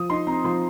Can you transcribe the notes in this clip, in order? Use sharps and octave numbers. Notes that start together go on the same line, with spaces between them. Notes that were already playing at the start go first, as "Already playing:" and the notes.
Already playing: F3 D#6
D#4 C6
C4 A#5
F3 C6